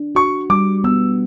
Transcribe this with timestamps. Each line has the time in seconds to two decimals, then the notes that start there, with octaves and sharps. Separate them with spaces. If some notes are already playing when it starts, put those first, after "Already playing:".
Already playing: D4
0.15 F#4 C#6
0.50 G3 D6
0.84 B3 E6